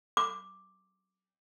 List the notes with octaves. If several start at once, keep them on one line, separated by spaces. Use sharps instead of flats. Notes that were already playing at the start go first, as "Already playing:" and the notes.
D6